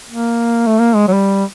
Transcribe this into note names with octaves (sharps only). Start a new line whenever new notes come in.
A#3
A3
A#3
G#3
F#3
G3